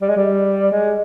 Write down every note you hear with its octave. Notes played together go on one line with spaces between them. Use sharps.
G3
G#3
G3
G#3